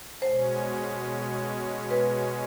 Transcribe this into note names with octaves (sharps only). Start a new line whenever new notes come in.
B2 G#3 C#4 C5
B4